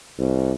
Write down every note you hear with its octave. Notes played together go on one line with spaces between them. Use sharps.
C2